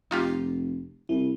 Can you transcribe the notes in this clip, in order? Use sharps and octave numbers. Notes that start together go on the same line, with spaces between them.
F1 D#4 F4 G4
C2 E4